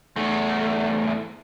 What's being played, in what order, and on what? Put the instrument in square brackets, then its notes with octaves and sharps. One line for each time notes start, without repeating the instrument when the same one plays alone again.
[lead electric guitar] E2 A3